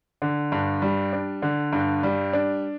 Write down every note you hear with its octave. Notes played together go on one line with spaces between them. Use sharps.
D3
G2
G3
D4
D3
G2
G3
D4